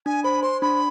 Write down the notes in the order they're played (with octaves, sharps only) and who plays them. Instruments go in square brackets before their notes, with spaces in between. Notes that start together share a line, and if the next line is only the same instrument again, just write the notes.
[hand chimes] D4 [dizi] G#5
[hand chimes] C5 [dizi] B5
[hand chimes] C5 [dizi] C6
[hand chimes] D4 [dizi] B5